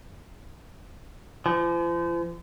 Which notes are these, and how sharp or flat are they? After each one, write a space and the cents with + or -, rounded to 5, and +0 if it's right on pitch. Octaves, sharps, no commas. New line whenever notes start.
F3 -40